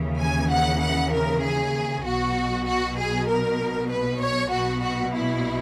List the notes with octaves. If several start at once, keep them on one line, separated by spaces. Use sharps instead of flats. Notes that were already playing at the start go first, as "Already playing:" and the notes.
Already playing: D#2 C#3 E3
G#5
F#5
F#5
A#4
G#4
B1 B2 F#4
F#4
G#4
A#4
B4
C#5
B1 B2 F#4
F#4
E4